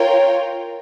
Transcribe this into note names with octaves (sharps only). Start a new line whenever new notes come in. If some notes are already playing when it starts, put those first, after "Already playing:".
Already playing: F4 A#4 C#5 G5